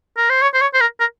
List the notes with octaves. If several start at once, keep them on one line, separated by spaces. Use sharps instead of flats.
A#4
C5
C#5
C5
C#5
C5
A#4
A#4